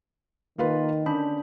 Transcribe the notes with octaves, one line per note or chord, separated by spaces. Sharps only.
D#3 A#3 F4 B4
D3 C#4 D4 B5